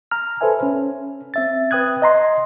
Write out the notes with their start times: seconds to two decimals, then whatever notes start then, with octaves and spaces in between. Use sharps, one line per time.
0.11 A#5 F6
0.41 A4 B4 C5 E5 G#5
0.63 C#4
1.34 C4 E5 A6
1.71 B4 G5 D#6 F#6 G#6
2.02 D#5 A#5 C6